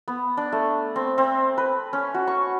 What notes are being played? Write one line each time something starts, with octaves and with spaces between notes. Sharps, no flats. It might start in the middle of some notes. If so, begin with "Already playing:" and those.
B3
D4
A3
C4
C4
B4
C#4
F#4
C#6